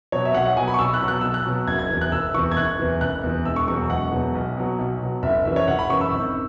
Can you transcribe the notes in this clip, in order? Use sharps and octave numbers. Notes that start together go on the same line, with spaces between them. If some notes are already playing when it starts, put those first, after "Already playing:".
B2 F#3 C#5
E5
B1 F#5
F#5
B2 F#3 G#5
B5
C#6
B1 E6
F#6
B2 F#3
F#6
B1 E6
F#6
B2 F#3
F#1 G#6
G#6
E2 E3
F#6
F#1 E6
E2 E3 C#6
G#6
F#1 F#6
E2 E3
F#1 F#6
E2 E3
E1 E6
C#6
E2 B2 F#3 C#6
E1 F#5
E2 B2 F#3
B1
B2 F#3
B1
B2 F#3
F#1 E5
F#2 E3 E5
C#5
F#1 F#5
B5
F#2 E3 C#6
E6
G#1